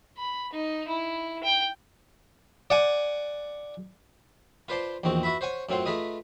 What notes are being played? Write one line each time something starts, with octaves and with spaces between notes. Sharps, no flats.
B5
D#4
E4
G5
D5 F#5 G#5
F4 B4 C5 D5 A5 C6
A#1 E2 D#3 C4 F#4
E4 F#4 B4 E5 B5
C5 C#5 F#5 G#5 C#6
F#2 A2 C4 F4 F#5 C6
A3 F4 G#4 B4 D#5